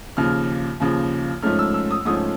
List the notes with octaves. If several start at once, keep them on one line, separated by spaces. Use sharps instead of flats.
D#2 C#3 F3 F6
D#2 C#3 F3
G#2 F3 A3 C#4 F6
E6
E6
D#6
G#2 F3 A3 C#4 D#6